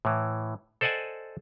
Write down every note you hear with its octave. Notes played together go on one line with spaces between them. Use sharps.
A2 E3
A4 C5 D5 D#5 F#5 G#5